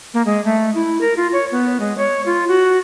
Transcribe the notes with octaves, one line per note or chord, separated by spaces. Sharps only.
A#3
G#3
A3
E4
A#4
F4
C#5
B3
G#3
C#5
F4
F#4